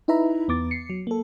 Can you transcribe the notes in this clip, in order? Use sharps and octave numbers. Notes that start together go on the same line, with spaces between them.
D#4 E4 B4 E5 A#5 B5
E2 B3 D6 A6
C7 C#7
F#3
A#3 A4